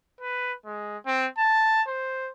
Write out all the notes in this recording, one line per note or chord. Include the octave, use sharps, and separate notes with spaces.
B4
G#3
C4
A5
C5